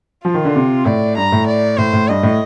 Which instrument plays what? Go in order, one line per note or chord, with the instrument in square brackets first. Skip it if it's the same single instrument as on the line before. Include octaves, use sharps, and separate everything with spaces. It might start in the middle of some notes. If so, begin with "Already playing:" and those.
[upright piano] F3 [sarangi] F4
[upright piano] D#3
D3
C3
[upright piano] A2 [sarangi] D5
[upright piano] G2 [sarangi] A#5
[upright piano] A2
[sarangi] D5
[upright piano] A2 [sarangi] C5
[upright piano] A2
[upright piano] G2 [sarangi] D#5
[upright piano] A2